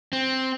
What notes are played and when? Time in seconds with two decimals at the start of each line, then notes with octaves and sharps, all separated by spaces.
0.13 C4